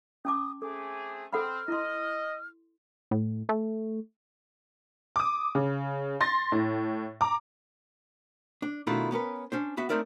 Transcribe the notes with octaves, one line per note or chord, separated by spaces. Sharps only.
C#4 A5 D6 D#6
A3 C4 G#4 A4 D6
C4 A4 F#5 B5 F6
E4 D#5 C6
A2
A3
D6 D#6
C#3
C6 A6 A#6
A2
A#5 D6
D4
B2 D#3 A3 D4 E4 F4
B3 C#4 A#4 B4
C#4 D4 C5
B3 F#4 E5 F#5
A3 C4 D#4 A#4 D5 E5